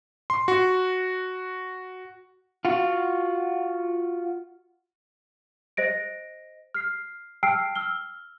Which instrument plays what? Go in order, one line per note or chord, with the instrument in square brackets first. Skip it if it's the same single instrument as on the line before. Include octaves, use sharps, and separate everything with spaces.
[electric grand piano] C6
F#4
[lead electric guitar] F4 F#4
[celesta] C5 D#5 A#6 D7
F6 C7
G5 A5 E6 F6 C7 D7
E6 F6 G7